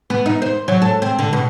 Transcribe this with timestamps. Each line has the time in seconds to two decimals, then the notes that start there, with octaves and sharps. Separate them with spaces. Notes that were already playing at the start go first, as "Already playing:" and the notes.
0.10 B3
0.26 D#4
0.42 C5
0.68 F#3
0.82 A4
1.02 C4
1.19 D3
1.33 B2